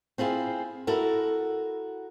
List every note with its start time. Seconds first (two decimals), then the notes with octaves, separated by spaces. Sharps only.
0.18 C4 E4 F4 G#4
0.87 E4 F#4 A4 A#4